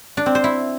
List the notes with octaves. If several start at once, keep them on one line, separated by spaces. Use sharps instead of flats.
D4
C4
C5
E4